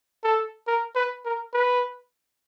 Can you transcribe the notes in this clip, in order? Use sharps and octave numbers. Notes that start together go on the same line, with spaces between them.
A4
A#4
B4
A#4
B4